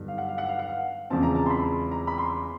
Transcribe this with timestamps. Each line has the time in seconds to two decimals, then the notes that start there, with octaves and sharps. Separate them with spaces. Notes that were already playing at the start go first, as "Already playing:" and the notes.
Already playing: G2 D3 F#3 B3 D#4
0.08 F5
0.18 F#5
0.29 F5
0.38 F#5
0.49 F5
0.59 F#5
0.69 F5
1.10 E2 C#3 F3 G#3 C4 A5
1.23 A#5
1.35 A5
1.46 C6
1.50 B5
1.91 A#5
2.07 B5
2.18 C6